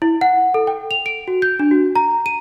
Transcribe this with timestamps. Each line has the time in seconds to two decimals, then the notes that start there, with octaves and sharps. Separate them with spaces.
0.02 E4
0.21 F#5
0.54 A4
0.67 G5
0.91 F7
1.06 D7
1.28 F#4
1.42 G6
1.59 D4
1.71 F#4
1.95 A#5
2.26 D#7